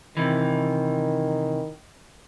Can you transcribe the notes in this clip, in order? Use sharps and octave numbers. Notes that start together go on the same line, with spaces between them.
C3 D#3 E3